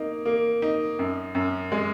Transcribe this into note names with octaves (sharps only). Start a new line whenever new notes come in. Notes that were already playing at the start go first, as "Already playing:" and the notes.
Already playing: A#3 D#4
A#3
D#4
F#2
F#2
G#3